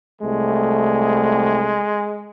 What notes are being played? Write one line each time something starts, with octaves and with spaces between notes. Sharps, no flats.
C2 G#3 A3